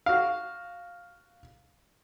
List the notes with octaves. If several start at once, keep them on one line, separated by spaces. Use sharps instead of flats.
F#4 F5